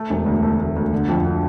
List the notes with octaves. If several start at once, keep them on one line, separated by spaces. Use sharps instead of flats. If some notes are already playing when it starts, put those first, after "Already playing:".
Already playing: A3
E1
D2
A3
D2
D2
D3
F2
D3